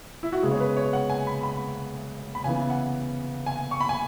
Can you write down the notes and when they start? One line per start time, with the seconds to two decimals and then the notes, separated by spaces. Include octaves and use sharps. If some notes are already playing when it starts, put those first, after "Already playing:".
0.23 E4
0.33 F#4
0.43 C#3 G#3 B3 G#4
0.51 C#5
0.60 B4
0.77 C#5
0.93 F#5
1.10 G#5
1.27 B5
1.43 B5
2.35 B5
2.44 C#3 E3 B3 G#5
2.70 F#5
3.46 G#5
3.71 C#6
3.81 B5
3.89 G#5